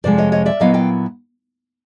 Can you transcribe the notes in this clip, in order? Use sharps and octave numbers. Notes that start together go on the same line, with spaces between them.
F2 C3 F3 G#3 C5 D5
C#5 D#5
C#5 D#5
D5 E5
A#2 F#3 B3 E4 D#5 F5
F5 G5